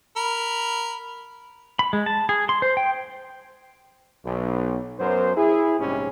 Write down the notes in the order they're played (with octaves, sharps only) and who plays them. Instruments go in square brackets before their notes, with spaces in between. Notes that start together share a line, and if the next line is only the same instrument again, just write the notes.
[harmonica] A#4 B5
[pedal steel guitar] B5
G#3
A5
G#4
C6
C5
G5
[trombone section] B1
F#2 F#3 B3 A#4 C5
E4 G#4
A#1 G#2 C3 G3 G#3 C#4